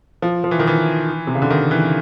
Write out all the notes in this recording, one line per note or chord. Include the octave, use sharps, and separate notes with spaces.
F3
F3
E3
D#3
E3
C3
C#3
D3
D#3
E3